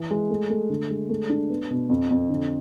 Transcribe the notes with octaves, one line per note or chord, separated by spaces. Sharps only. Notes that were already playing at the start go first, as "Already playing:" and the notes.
Already playing: E3
G#3
A3
A3
D3
G#3
A3
D4
B3
B2
F2
F2
D3